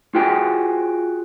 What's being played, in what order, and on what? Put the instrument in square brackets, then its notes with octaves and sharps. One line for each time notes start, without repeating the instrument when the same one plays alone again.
[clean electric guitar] F4 F#4 G#4 C5 G5